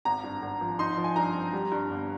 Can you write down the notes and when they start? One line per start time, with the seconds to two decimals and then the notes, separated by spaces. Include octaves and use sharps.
0.05 G#1 A#5
0.24 G2
0.42 G#1
0.61 F3
0.79 D#4 C6
0.97 F3
1.04 G#5
1.16 G2 A#5
1.35 C4
1.53 G3
1.72 G2
1.90 G1